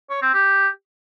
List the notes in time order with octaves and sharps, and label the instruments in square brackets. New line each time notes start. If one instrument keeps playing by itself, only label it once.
[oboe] C#5
C4
G4